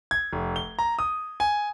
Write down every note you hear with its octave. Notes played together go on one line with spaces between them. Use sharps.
G#6
F1
G7
A#5
D#6
G#5